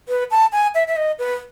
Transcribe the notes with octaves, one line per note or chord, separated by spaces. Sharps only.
B4
A5
G#5
E5
E5
D#5
B4